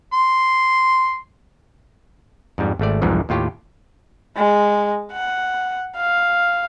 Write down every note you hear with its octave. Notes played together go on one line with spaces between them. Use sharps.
C6
F2 G#2 G3
G#1 A3 D5
C2 F2 G#2 E3 F3
D#2 A2 F4 G4
G#3
F#5
F5